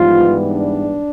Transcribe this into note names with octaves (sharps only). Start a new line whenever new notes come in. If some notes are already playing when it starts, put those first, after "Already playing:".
Already playing: G#2 E3 F3 G3 B3 F4
D4